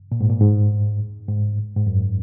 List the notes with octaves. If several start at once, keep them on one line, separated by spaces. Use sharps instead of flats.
A#2
G#2
A#2
G#2
G#2
G#2
F#2